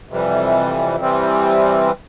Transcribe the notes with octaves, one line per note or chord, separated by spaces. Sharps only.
F2 C3 E3 G3
C3 E3 G3 C4